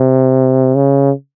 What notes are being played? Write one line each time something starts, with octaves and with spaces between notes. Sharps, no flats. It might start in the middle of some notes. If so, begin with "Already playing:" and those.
Already playing: C3
C#3